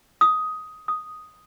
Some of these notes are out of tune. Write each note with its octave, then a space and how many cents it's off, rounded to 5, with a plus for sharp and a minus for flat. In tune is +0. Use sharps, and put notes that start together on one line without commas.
D#6 +10
D#6 +0